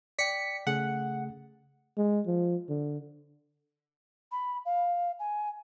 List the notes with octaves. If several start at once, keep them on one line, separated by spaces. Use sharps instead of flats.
D5 G5 B6 C#7
C#3 A3 G#4 F#5
G#3
F3
D3
B5
F5
G#5